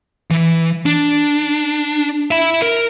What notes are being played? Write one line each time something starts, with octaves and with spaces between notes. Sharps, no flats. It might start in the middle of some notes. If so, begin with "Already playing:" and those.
E3
D4
E5 B5
A#4